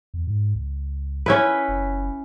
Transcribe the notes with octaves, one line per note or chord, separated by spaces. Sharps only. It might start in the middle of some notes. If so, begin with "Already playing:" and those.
E2
G#2
C#2
C#4 E4 B4
F#1